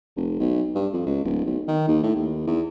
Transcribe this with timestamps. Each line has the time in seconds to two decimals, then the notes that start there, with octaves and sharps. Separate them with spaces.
0.16 F1
0.40 B1
0.75 G2
0.93 F2
1.06 C#2
1.24 D1
1.46 B1
1.68 D#3
1.88 D#2
2.03 A2
2.16 D#2
2.47 E2